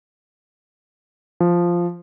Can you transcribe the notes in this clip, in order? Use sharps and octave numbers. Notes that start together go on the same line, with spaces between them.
F3